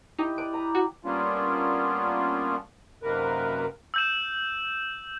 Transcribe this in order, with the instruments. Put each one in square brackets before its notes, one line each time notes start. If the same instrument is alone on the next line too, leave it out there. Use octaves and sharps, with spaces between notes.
[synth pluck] D#4 [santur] E4 G4 D#5
[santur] B4 D5 [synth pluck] D7
[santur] A#5
[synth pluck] F#4
[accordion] G3 A#3 B3 C#4 D4 F4
F#2 C3 D#3 A#3 A#4 B4
[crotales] E6 G6 E7